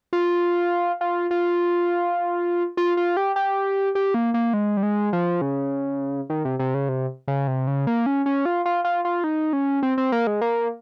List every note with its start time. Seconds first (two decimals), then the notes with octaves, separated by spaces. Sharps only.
0.13 F4
1.01 F4
1.31 F4
2.77 F4
2.97 F4
3.17 G4
3.36 G4
3.95 G4
4.14 A#3
4.34 A#3
4.54 G#3
4.77 G3
4.83 G#3
5.13 F3
5.41 C#3
6.30 D#3
6.45 C3
6.59 C3
6.74 C#3
6.89 C3
7.28 C#3
7.48 C3
7.67 C#3
7.87 A#3
8.06 C#4
8.26 C#4
8.46 F4
8.66 F4
8.85 F4
9.05 F4
9.24 D#4
9.53 C#4
9.83 C4
9.98 C4
10.12 A#3
10.27 G#3
10.41 A#3